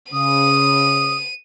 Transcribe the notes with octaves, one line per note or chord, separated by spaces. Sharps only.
C#3 D#6 D#7